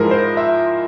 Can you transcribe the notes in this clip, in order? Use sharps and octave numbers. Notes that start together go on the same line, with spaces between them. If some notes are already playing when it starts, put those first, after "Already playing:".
Already playing: G#2 F3 G#3 E4 A#4
C5
E5